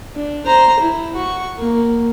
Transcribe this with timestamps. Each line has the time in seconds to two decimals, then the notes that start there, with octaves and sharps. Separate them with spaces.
0.16 D4
0.46 C5 A#5
0.80 E4
1.15 F#4 C#6
1.59 A#3